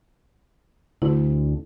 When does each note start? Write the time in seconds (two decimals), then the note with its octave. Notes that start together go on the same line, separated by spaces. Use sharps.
1.02 D2 E4